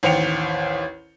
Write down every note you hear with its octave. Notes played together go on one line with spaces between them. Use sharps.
A1 D#2 C5 G5 C#7 F7